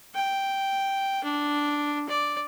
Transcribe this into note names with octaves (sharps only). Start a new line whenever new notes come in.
G5
D4
D5